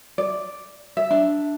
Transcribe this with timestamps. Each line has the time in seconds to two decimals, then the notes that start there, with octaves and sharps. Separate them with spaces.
0.18 D5
0.97 E5
1.11 D4